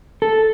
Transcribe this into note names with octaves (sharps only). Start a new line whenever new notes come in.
A4